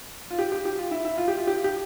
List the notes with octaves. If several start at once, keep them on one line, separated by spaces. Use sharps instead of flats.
F4
G4
G4
G4
F4
E4
E4
F4
G4
F4
G4
G4